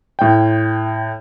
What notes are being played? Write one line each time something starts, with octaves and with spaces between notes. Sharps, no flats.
A2 G5